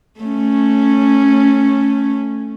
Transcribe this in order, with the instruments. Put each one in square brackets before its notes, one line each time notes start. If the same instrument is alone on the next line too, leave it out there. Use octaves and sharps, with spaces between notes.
[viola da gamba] A3 C#4